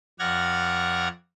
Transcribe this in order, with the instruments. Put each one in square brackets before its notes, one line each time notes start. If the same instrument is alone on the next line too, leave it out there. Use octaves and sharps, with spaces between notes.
[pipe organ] F2 D5 F#5 F6 G#6 A#6